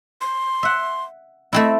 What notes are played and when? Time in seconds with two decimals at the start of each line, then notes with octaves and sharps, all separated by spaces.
0.21 C6
0.63 E5 F#5
1.53 A3 C4 E4 D#5